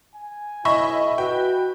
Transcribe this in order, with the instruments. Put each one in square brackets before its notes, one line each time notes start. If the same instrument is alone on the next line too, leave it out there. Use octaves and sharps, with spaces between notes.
[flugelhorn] G#5
[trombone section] B1 E4 [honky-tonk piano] D#5 E5 B5 [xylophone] C#6
[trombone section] F#4 [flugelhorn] B4 [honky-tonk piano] G5